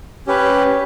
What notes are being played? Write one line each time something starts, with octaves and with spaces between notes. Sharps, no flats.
C#4 G4 B4